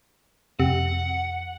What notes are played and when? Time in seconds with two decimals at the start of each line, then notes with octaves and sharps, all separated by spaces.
0.60 F2 C3 F#5